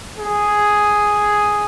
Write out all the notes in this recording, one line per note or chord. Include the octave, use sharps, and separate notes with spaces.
G#4